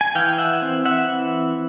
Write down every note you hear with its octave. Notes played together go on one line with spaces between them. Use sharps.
G#5
E3 F5 G5
E5 F#5
C4
E5 F#5
E3